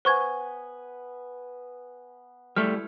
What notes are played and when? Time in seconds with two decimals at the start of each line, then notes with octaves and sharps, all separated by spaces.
0.05 B3 C5 G#5 C#6 G#6
2.56 G3 A3 E4 F6